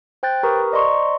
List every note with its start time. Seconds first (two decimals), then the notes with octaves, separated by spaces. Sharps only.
0.23 C5 G5 F#6 G6 A6
0.43 G4 A#4 B4 A#5 C#6 D#6
0.72 C5 D5 D#5 A#5 C6 C#6